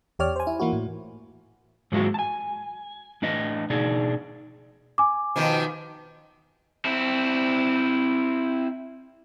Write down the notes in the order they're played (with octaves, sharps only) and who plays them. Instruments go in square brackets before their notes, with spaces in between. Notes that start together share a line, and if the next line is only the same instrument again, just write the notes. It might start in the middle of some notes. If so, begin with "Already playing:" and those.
[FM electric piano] E2 G4 C#5 D5 F6
C5 G#5
E4
E3 A#3 E4 F#4
A2
[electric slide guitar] G#2 F#3 G#3 A#3 E4 F#4
G#5 A5
A2 D4 B4 D#5
B2 D4 D#4 G#4
[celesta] G#5 D6
[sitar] B2 D#3 F3
[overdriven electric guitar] C4 E4